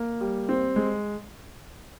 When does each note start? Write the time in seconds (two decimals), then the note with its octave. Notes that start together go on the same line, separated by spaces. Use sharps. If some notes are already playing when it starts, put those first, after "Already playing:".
Already playing: A#3
0.21 G3
0.49 C4
0.76 G#3